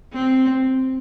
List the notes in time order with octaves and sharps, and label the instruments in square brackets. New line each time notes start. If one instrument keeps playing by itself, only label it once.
[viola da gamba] C4